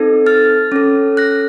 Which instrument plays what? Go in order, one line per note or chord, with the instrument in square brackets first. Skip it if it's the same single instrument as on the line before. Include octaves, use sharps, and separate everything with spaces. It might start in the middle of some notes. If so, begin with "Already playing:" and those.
Already playing: [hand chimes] C4 D#4 A4
F6 A6
C#4 A4
F#6 A#6